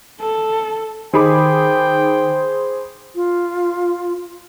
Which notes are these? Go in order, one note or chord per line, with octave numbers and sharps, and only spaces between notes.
A4
D#3 G#4 C5 G5 B5 D6
F4